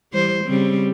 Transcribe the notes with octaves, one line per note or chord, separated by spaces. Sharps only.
E3 G3 C5
C#3 G3 C4